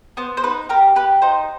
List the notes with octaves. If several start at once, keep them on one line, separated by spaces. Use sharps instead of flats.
B3 C5
C5
D#4 B4
G4 A#4
G4 B4
D#4 C5